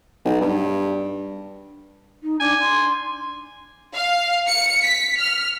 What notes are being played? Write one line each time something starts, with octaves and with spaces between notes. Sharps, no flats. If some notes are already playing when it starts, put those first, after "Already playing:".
B1
G2
D#4
D4 G#5
C6
F5
C#7
B6
F6